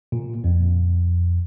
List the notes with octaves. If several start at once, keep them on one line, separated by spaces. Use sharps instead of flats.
A#2
F2